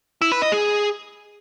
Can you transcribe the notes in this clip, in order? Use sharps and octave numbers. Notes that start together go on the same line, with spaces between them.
E4
B4
D#5
G#4